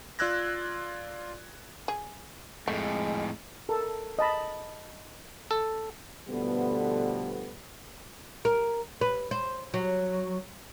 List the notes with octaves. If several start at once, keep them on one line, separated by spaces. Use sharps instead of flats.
F4 D5 E6 F#6 G#6 A#6
G#4
F2 A2 G#3 A3
A4 A#4
D#5 A5 B5
A4
B2 D3 F3 G3 A3 B3
A#4
B4
C5
F#3